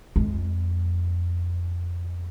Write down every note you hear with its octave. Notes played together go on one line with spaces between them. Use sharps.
F2 G#3